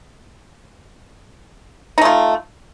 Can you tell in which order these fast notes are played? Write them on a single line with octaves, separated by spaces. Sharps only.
D#4 A3 F4